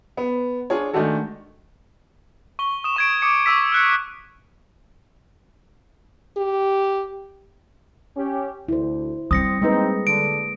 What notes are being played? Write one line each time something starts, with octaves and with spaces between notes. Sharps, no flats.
B3
D4 F4 G#4 C#5
D#3 G#3 A3 D4 F#4 A4
C#6 G7
D#6 E7
C#6 G#6 D7
D6 D#6 C#7 D#7
C#6 D6 E6 B6
F6 F#6 C#7
G4
C#4 G4
D2 E4 C5
G3 C4 D#6 A#6 C#7
G#3 A#3 C4 D#4 B4
D3 D7